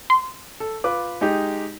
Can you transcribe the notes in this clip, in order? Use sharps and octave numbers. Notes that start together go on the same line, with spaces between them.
C6
A4
F4 B4 D6
G#3 D#4 G4